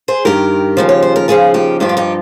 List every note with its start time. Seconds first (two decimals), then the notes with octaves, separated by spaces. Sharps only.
0.08 G#4 C5
0.25 G2 D#3 G4 A#4
0.77 D#2 C#3 F3
0.89 C#5
1.02 C5
1.16 A#4
1.28 D#2 C#3 F3 F4 G#4
1.54 D#4 G4
1.80 G2 F3 D#4 G4
1.89 F4
1.97 D#4 G4